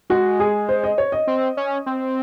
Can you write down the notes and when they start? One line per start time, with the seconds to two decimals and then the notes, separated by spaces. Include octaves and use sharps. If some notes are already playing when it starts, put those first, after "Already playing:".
0.10 G#3 F#4
0.40 G#4
0.69 C5
0.84 D#5
0.98 C#5
1.12 D#5
1.27 C4
1.57 C#4
1.86 C4